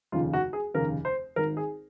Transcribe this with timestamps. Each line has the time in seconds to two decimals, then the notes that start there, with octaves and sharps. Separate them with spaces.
0.12 F1 D#2 C#3 F4
0.33 F#4
0.53 G#4
0.74 F1 D#2 C#3 A#4
1.05 C5
1.36 G#1 G#2 D#3 A#4
1.57 G#4